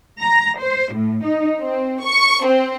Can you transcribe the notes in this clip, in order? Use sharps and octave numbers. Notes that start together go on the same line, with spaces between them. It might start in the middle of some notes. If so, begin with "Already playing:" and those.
A#5
C5
A2
D#4
C4
C#6
C4